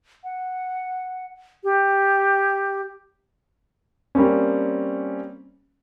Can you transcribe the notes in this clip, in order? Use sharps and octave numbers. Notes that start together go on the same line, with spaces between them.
F#5
G4
G3 A#3 C4 C#4